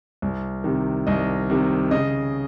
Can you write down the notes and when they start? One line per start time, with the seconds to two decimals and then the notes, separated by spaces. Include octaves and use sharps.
0.22 C2
0.64 C3 D#3
1.07 C2 D#5
1.50 C3 D#3
1.91 C#3 D#5